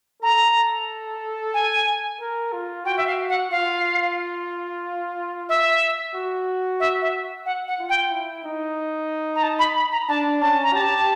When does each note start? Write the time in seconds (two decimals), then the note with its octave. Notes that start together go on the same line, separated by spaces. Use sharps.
0.22 A4 A#5
1.54 G#5
2.20 A#4
2.52 F4
2.85 F#4 G5
2.97 E5
3.07 F5
3.29 F#5
3.51 F4 F5
5.49 E5
6.15 F#4
6.80 E5
7.02 E5
7.46 F#5
7.68 F#5
7.79 F4
7.89 G5
8.11 E4
8.45 D#4
9.35 A#5
9.43 A5
9.59 B5
9.76 B5
9.92 A#5
10.08 D4 A5
10.41 C#4 A5
10.63 A#5
10.74 G4 A5